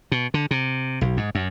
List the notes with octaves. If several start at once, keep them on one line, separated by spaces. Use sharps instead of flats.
B2
D3
C3
B1
G#2
F#2